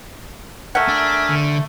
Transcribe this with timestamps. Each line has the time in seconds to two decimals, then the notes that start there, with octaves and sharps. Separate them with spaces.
0.75 A3 A#4 E5 F#5 G#5
0.88 D4
1.30 D3